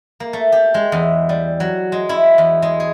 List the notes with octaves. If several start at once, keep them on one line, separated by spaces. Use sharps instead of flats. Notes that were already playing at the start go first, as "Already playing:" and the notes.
A#3
A3
G4
G#3
E2
G3
F#3
G#3
E4
E2
G#3
G#4